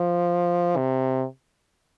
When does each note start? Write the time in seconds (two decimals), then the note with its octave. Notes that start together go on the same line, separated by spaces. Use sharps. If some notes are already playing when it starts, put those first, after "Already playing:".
Already playing: F3
0.77 C3